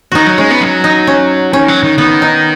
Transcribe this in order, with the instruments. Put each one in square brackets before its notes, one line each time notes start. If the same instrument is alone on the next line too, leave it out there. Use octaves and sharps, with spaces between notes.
[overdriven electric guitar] D#3 [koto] D#4 F#4
[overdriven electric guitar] F#3
[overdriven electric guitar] G#3 [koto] C#4
[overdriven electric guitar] B3
F#3
[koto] D#4
C#4
[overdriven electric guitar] D#3 [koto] C#4
[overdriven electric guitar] F#3
D#3
[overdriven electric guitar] D#3 [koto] B3
[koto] D#4